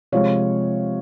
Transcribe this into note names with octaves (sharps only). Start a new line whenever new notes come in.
C3 F3 G#3 C#5 F5